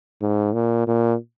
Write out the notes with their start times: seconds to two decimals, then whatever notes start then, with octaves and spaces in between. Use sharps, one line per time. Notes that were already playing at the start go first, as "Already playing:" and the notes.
0.22 G#2
0.53 A#2
0.87 A#2